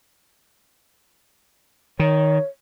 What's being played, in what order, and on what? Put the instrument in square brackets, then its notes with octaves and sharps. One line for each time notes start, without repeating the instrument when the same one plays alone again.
[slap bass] D#3 [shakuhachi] C#5